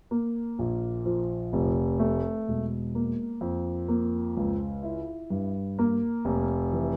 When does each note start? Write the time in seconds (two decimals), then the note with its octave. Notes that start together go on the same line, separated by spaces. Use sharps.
0.11 A#3
0.59 A#1
1.06 F3
1.53 F1
1.99 A3
2.48 E1
2.95 A#3
3.41 F2
3.88 A#3
4.37 C#2
4.83 E4
5.30 G2
5.79 A#3
6.25 F1
6.73 E3